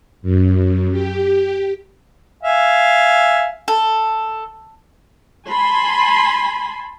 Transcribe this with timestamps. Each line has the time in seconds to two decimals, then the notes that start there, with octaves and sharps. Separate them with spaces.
0.22 F#2
0.91 G4
2.43 E5 F5 G#5
3.68 A4
5.48 G#5 A5 B5 C6